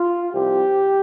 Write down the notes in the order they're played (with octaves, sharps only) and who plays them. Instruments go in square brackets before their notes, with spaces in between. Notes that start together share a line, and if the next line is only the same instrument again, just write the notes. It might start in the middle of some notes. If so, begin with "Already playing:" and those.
Already playing: [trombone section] F4
C2 C3 F3 C4 G4